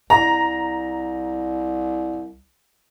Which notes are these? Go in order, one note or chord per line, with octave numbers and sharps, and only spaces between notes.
C2 A#5